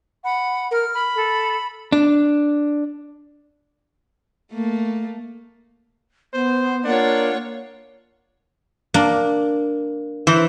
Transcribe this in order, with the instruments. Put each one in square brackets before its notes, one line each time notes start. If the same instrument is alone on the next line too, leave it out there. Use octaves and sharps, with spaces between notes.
[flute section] F#5 B5
[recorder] A#4 [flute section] F6
[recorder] B5
[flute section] A4
[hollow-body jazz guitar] D4
[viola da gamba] A3 A#3
[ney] B3 [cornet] C5
[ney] A#3 [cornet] D4 [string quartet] F4 C#5 F#5
[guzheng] A#3 D4
[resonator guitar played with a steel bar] E3 [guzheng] C5